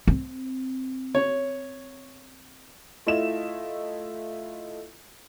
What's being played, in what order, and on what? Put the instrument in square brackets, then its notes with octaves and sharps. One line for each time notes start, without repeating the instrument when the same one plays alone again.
[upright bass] C4
[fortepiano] C#5
[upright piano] A3 E4 F4 D#5 E5 E7